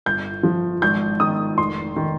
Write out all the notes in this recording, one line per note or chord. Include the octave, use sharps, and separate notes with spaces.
G1 G6
F3
G#1 G6
D#3 D#6
F1 C6
D#3